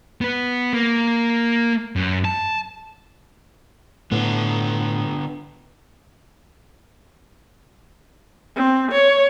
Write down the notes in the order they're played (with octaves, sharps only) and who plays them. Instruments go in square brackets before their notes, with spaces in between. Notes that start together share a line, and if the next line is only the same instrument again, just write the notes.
[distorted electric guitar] B3 B4
A#3
F#2
A5
[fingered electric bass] A2 [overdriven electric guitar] D3 B3
[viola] C4
C#5